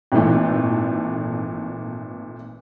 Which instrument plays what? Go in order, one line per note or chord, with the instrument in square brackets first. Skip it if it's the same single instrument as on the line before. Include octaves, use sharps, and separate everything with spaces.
[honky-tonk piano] G#1 A#2 E3 A3